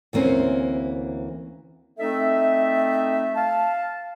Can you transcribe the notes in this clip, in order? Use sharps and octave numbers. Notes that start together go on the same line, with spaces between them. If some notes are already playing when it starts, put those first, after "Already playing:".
D2 E3 A#3 C4 C#4
A3 C4 D#4 A4 D#5 E5
F5 A5